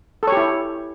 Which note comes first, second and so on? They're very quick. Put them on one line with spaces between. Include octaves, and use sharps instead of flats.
A4 C#5 G4 E4